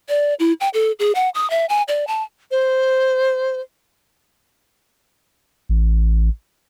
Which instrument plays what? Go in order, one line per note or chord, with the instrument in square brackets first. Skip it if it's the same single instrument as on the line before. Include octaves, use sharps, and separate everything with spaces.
[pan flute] D5
E4
G5
A4
G#4
F#5
D#6
E5
G#5
D5
A5
[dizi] C5
[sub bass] A1